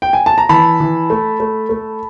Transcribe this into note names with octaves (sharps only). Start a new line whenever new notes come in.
G5
G#5
A5
A#5
E3 A5 B5
E3
A3
A3
A3